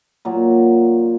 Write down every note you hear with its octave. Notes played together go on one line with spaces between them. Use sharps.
A#2 F#3 A#3